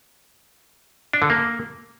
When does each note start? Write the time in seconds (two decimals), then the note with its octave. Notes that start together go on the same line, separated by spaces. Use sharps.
1.13 D4
1.22 D3
1.30 A#3